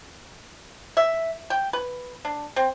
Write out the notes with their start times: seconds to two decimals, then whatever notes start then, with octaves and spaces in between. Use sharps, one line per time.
0.97 E5
1.50 G5
1.73 B4
2.25 D4
2.56 C4